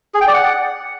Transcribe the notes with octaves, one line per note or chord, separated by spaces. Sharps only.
G#4
G5
D5
F#5